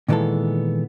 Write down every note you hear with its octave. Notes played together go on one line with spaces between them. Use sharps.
A#2 D#3 E3 G#3 B3 A4